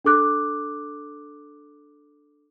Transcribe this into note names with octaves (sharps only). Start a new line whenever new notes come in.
D4 A4 D6 F#6